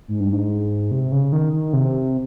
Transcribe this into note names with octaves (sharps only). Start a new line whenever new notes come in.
G#2
G2
G#2
C3
C#3
D#3
D#3
C3